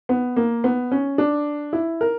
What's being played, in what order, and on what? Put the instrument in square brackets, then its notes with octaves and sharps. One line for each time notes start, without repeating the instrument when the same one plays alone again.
[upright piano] B3
A#3
B3
C#4
D4
E4
A#4